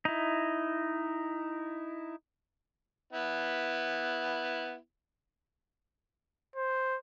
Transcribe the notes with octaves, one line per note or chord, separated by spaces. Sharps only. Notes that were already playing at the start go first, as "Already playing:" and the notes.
D#4 E4
B3 E4
C5